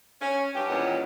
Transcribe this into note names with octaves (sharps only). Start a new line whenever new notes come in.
C#4
G2 G4
E2 A#2 D#3 B3 C#4 F#5